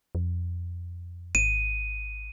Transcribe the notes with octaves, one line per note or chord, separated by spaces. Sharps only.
F2
G#1 D#7